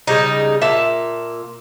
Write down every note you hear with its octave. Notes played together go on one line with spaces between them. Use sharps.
C#3 G3 D#4
A#2 E5 A5